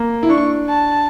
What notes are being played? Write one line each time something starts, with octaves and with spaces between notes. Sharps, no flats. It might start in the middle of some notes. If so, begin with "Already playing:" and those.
Already playing: A#3
E4
D4 C#6
A5